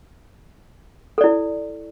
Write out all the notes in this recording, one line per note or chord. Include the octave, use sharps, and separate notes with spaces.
E4 A4 D5